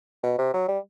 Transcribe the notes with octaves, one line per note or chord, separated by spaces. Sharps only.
B2
C3
F#3
G3